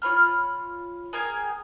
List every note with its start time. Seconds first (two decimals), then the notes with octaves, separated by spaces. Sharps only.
0.02 F4 C#5 B5 F6
1.13 G#4 A#4 G5 G#5